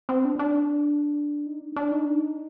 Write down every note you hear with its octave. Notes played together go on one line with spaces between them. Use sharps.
C4
D4
D4
D#4
D4
D4
D#4
D4
D#4